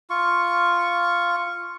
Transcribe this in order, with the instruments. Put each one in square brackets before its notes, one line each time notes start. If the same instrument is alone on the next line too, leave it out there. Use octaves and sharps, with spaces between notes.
[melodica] F4 C#6